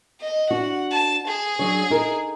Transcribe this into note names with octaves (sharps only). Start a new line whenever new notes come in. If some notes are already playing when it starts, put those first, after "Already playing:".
D#5
D4 F#4 F#5
A5
G#4
F#3 D4 C#5
D#4 A4 A#4